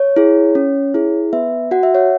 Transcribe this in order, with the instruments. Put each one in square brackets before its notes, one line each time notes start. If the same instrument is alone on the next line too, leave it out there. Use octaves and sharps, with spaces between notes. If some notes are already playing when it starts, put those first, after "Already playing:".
Already playing: [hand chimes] C#5
E4 G#4
C#4
E4 G#4
B3 B4 E5
F#4 F#5
E5
C#5 F#5